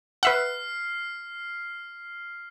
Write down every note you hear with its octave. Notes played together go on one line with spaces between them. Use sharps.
B4 E5 F#5 F6 C7